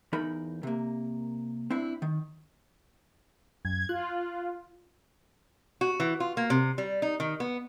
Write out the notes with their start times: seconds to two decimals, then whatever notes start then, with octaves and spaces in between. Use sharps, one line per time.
0.13 E2 D#4 A#4 B5
0.63 C3 A#3
1.70 C4 D4 E4 E5
2.02 D#3
3.65 F#2 G#6
3.89 F4 F#6
5.81 F#4
6.00 E3
6.20 F4
6.37 A#3
6.50 C3
6.78 G3
7.02 D#4
7.20 D#3
7.40 B3